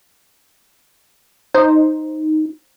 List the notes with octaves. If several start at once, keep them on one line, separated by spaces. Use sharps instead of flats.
D#4 C5